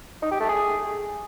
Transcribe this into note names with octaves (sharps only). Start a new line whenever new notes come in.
D#4
G4
A3
G#4